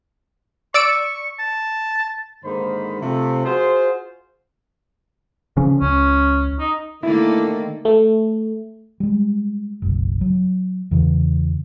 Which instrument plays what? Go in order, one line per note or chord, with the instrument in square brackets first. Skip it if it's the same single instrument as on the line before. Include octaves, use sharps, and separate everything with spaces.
[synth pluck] D5 E6 D7 [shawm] C#6
[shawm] A5
[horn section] G#2 D3 D#3 A#3 C5 B5
C3 F3 A3
F4 F#4 G#4 C5
[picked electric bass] C#3 F3 C#4
[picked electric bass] C#2 [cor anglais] C#4
[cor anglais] D#4
[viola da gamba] D3 A3 A#3 [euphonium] D#3 [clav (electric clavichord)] E4
[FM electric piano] A3
[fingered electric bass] G3 G#3
F#1 B1
F#3
E2 C#3 E3